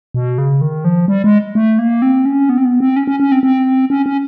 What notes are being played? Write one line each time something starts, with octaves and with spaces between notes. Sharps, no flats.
B2
C#3
D#3
F3
G3
G#3
A3
A#3
C4
C#4
B3
C4
B3
C4
C#4
C#4
C#4
C4
C4
C#4
C#4